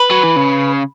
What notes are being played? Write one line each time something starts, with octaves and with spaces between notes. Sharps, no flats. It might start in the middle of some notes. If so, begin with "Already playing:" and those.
Already playing: B4
F#3
E3
C#3